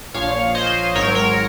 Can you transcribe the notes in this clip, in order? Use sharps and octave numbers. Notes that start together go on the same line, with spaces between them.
A#1 A#2 F3 C#5 F5
C5 D#5
G#1 G#2 F#3 C4 A#4 C#5
A#4 C#5